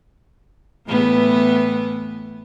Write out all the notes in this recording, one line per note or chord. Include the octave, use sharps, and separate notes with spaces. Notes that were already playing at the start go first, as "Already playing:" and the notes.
A2 E3 B3